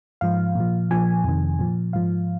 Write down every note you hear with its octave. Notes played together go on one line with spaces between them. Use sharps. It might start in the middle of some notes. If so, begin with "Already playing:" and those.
G#2 F3 F5
A#2 F3
A#2 F3 G#5
F2 C3 D#3
A#2 F3
G#2 F3 F5